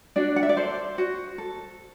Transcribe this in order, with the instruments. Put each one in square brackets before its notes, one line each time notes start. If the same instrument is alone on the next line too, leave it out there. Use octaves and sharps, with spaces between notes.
[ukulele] D4 F#4 D5
F#5
E5
D5
A4 C5
F#4
A4